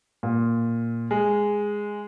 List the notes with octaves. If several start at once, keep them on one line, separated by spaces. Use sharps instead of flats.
A#2
G#3